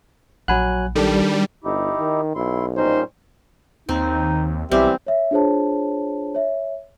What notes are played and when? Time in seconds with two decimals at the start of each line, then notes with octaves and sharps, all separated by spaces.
0.48 A#1 F#3 F#5 G#5 B5 F#6
0.95 D#3 G3 D4 A4
1.64 G1 D#4 E4 G4
1.99 D#3
2.35 B1 E4 C6
2.76 A#2 G3 C#4 D#4 C5
3.89 D#2 C4 D#4
4.72 B1 E3 G3 C4 G4 E5
5.07 C#5 E5
5.31 D4 F4 G#4 C5 C#5 A5
6.35 C#5 E5